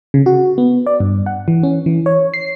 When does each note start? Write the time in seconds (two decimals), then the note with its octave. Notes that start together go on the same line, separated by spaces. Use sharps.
0.14 C#3
0.26 F#4
0.58 B3
0.87 D5
1.00 G2
1.26 F#5
1.48 E3
1.63 C#4
1.86 E3
2.06 C#5
2.34 C7